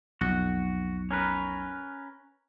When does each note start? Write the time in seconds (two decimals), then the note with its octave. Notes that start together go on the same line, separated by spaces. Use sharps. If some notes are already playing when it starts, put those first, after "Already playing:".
0.21 B1 F2 F#4
1.11 C#4 A#4 B4